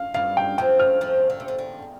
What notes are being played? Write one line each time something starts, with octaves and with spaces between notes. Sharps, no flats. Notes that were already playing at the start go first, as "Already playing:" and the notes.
Already playing: F5
G2 G3 F5
G5
F2 F3 G5
F6
F2 F3
D3
C3
D3
D3